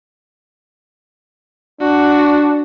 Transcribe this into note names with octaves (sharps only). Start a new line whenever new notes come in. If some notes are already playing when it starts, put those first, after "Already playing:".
D4 F#4